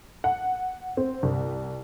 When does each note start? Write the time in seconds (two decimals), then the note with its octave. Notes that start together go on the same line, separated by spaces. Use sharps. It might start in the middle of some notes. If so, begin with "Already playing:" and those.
0.24 F#5
0.97 C4
1.23 C2